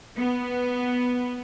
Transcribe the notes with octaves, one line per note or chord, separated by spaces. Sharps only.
B3